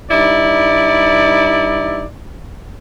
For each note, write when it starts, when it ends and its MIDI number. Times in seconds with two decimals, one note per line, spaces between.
0.11 2.05 43
0.11 2.05 63
0.11 2.05 64
0.11 2.05 74